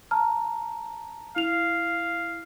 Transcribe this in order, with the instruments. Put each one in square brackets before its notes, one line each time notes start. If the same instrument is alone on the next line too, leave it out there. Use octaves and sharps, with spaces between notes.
[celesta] A5 A#5 F6
[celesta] E4 F7 [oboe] F5